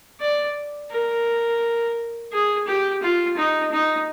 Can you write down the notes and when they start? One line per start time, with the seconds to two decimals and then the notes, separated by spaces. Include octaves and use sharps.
0.21 D5
0.91 A#4
2.32 G#4
2.67 G4
3.02 F4
3.37 D#4
3.72 D#4